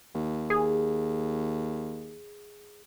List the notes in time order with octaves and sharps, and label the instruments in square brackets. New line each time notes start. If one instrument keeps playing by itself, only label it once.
[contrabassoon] D#2
[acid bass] G#4